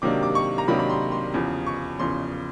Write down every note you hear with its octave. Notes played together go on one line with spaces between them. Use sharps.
C3 D#3 F#3 A#3 D4 D6
D6
C#6
A#5
C3 D#3 F#3 A#3 D4 B5
B5
C6
C6
E2 C#3 F3
C#6
E2 C#3 F3 C6